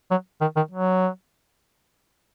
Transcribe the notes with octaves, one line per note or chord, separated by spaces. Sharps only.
F#3
D#3
D#3
F#3